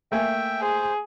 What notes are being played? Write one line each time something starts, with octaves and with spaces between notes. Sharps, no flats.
A3 A#3 E5 G5 G#5
G#4 C5